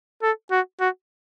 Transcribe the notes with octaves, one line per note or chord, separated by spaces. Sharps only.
A4
F#4
F#4